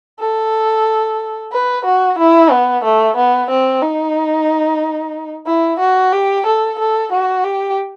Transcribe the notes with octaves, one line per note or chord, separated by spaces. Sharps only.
A4
B4
F#4
E4
B3
A3
B3
C4
D#4
E4
F#4
G4
A4
A4
F#4
G4